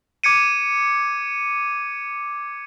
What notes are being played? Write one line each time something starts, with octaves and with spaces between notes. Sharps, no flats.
D6 G#6 C#7 D#7